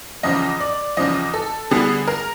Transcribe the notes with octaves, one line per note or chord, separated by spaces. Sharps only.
E2 C#3 F3 D#5
D5
E2 C#3 F3 D#5
A4
D3 G3 B3 G#4
A#4